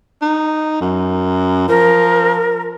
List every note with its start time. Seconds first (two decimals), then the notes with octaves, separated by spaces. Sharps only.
0.22 D#4
0.81 F#2
1.68 F3 A#4